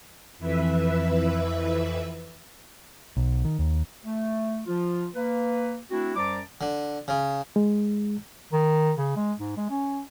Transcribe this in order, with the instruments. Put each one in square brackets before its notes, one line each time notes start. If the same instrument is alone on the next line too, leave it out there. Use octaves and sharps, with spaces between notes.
[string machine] F2 E3 B4 E5
[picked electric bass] B1
D#3
D#2
[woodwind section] A3
F3 F4
A#3 B4
A3 C4 D4 E4 F#4
F#2 G3 C5 A5 A#5 D6
[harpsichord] D3
C#3
[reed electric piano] G#3
[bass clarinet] D#3
C#3
G#3
G#2
G#3
C#4